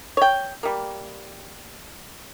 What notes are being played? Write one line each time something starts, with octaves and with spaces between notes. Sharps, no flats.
C#5 G5
G3 A#3